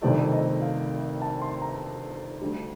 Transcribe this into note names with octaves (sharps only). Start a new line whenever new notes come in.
G1 F2 C3 D#3 A3 D5
D#5
F5
A5
C6
A#5
D2 D3 G3